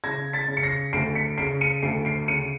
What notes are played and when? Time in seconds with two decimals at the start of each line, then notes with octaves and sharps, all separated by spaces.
0.04 C#3 G#6 A#6
0.33 A6 B6
0.48 C#3
0.57 C#7
0.63 A#6 C7
0.93 D2 C7 D7
1.15 B6 C#7
1.38 C#3 C7 D7
1.61 C#7 D#7
1.83 D2 C7 D7
2.05 C7 D7
2.28 C#3 C#7 D#7